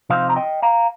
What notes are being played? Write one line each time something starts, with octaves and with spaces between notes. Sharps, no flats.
C3 F3 C4 D#4 C5 F5
A#5
D#5 G5
F5 A#5